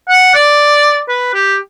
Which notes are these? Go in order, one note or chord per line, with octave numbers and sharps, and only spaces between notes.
F#5
D5
B4
G4